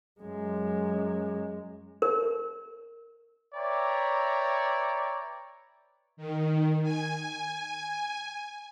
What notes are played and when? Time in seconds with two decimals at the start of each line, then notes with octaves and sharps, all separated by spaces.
0.21 F#2 G#3
2.02 A#4
3.54 B4 C#5 D5 E5 G5 A#5
6.17 D#3
6.83 G#5